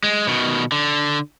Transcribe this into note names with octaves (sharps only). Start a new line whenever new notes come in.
G#3
B2 D#3
D3